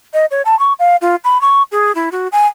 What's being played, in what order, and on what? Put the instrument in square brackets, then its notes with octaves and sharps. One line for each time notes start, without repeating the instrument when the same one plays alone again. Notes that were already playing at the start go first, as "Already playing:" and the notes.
[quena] D#5
C#5
A5
C#6
F5
F4
B5
C#6
G#4
E4
F#4
G#5